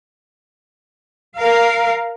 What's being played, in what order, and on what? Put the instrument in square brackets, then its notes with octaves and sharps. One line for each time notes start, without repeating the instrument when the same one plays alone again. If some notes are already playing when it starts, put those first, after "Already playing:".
[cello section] A#4 F5